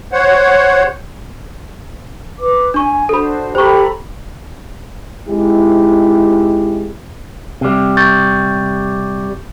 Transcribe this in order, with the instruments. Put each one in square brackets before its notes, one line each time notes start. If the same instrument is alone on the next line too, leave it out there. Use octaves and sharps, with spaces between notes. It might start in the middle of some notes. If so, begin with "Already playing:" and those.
[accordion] C5 C#5 F#5
[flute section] B4 D6
[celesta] D4 C#6 [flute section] G#5
[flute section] D4 F#4 C5 [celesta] A4 B5
[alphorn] G4 [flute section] A4 A#5 B5 [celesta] C5 C#6
[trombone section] G#3 C4 D#4 E4 G4
[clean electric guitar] C3 G3
[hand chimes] C#6 G6 A6